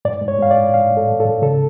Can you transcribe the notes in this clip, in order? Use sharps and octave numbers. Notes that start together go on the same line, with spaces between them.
G#2 D5
G#2
C#5
G#2 F5
D5
G#2
G#2 F5
G#2
A4
G#2
A4
G#2
C#3 A4